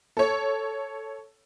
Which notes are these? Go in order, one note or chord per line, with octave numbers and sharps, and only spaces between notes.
A4 C#5